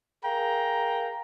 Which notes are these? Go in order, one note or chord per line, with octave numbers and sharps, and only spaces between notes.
G#4 A#4 F5 G5 A#5